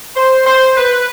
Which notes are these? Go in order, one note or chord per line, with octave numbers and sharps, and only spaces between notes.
C5
C5
B4